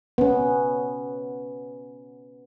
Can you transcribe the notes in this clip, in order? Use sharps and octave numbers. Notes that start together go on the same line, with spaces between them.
B3 C#4